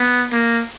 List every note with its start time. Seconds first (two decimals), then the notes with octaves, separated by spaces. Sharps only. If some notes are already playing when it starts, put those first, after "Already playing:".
Already playing: B3
0.32 A#3